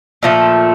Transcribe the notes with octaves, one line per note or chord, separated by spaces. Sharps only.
A#2 F3 A3